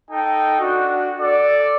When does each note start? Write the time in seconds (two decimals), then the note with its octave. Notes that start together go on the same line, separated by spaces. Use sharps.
0.10 D#4 A4 G5
0.58 D4 F#4
1.19 A4 D5